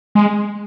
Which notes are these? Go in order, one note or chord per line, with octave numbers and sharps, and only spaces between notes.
G#3